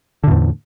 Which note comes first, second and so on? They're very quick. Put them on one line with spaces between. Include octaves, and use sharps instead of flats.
D3 A2 E2